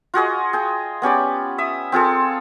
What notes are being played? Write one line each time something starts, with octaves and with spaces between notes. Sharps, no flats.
F4 F#4 G#4 D#5
G#4 G5
B3 C#4 G4 D5
E5 D#6
C4 F4 G#4 A4